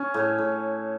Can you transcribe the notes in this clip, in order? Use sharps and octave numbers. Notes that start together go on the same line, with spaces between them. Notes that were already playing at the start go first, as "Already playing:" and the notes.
Already playing: C#4
A2
A2